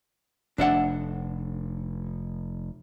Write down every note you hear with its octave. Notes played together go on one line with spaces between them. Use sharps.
F1 D4 E5 F#5